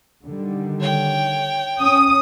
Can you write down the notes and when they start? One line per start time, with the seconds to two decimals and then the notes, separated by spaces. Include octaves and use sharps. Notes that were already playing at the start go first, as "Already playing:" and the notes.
0.24 D3 D#3 G3
0.80 C#5 G5
1.81 C#4 D#6